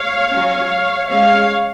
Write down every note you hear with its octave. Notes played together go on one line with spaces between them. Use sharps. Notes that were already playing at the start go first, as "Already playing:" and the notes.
Already playing: C#5 F5
F#3 C#4
G#3 C#4 C#5 F5